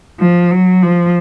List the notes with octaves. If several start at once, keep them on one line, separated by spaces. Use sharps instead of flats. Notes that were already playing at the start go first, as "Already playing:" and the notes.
F3
F#3
F3